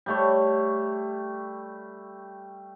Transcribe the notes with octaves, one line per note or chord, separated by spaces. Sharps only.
G3 A3 C#5